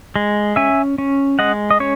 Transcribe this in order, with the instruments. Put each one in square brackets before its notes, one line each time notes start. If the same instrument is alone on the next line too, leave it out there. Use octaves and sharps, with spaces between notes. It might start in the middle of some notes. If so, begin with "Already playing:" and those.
[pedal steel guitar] G#3
C#4 E5 G#5
C#4
G#3 D#5 F#5
D#5
C#4 C#5